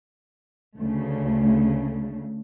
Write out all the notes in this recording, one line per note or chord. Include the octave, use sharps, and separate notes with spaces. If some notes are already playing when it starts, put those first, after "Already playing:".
D2 C#3 A3